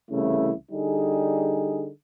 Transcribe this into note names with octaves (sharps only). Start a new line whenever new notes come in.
C2 C#3 E3 A3 E4
D3 G3 D#4 G#4